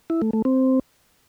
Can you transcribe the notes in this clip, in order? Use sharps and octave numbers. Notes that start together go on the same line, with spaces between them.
E4
A3
A3
C4